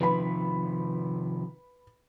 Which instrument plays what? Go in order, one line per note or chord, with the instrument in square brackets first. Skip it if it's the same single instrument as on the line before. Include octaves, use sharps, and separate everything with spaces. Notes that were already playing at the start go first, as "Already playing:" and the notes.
[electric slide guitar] C3 D#3 F3 [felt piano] B4 B5